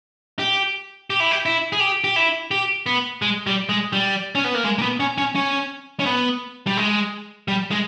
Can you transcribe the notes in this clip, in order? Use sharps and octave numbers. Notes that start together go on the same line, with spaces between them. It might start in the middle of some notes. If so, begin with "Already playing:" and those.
G4
G4
E4
G4
E4
G#4
G4
G4
E4
G4
B3
G#3
G3
G#3
G3
C#4
B3
A#3
G#3
A#3
B3
C#4
C#4
C#4
C#4
B3
G3
G#3
G3
G#3